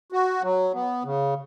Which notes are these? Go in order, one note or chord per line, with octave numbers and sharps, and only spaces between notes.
F#4
F#3
B3
C#3